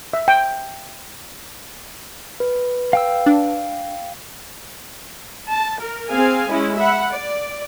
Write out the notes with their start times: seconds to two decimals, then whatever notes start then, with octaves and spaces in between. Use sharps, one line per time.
0.13 E5
0.28 G5
2.40 B4
2.93 F5 G5 E6
3.26 D4
5.47 A5
5.80 A#4
6.10 C4 G#4 F5 G#5
6.49 G#3 C#4 E4
6.78 E5 F#5 B5
7.13 D5